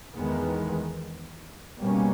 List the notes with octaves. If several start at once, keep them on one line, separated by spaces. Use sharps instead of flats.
E2 D#3 G#3 B3
B2 G3 A#3 C#4